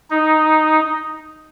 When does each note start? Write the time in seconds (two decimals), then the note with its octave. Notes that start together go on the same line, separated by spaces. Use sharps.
0.10 D#4